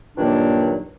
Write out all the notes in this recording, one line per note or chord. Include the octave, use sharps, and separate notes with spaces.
G2 A#2 D#3 F#3 A#3 D4